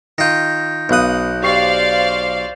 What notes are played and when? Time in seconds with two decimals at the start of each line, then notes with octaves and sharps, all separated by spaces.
0.18 D#3 F4 G6 A#6
0.89 B1 B3 F5 D#6 F#6
1.43 G4 C5 D5 F5 C#6 C7